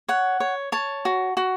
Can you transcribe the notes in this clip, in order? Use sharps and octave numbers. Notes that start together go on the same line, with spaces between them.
C#5 F#5
C#5
C#5 A5
F#4
F#4